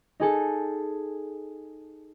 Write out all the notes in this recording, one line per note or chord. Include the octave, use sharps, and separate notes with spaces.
D#4 G#4 A4